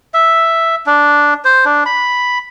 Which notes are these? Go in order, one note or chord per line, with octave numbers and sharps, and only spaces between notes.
E5
D4
C5
D4
B5